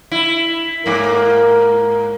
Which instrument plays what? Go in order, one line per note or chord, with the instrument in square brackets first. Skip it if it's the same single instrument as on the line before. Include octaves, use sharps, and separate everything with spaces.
[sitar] E4
[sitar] G#2 A#3 [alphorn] A#4